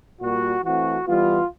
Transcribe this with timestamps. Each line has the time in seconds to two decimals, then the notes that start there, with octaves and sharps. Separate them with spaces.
0.21 A#2 G3 A#3 F#4
0.64 E3 A3 C4 F#4
1.05 E3 G3 B3 F4